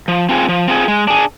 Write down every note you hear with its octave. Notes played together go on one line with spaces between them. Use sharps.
F3
C4 F4 G#4
F3
C4 F4 G#4
G#3
D4 G#4